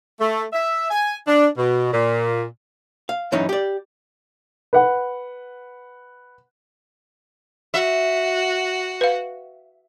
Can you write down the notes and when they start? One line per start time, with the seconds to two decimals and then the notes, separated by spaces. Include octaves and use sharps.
0.20 A3
0.53 E5
0.90 G#5
1.27 D4
1.57 B2
1.93 A#2
3.09 F5
3.32 G2 E3 F#3 C#4 D#4
3.49 G4 D5
4.73 B4 F#5
7.74 F#4 E5
9.01 B4 F5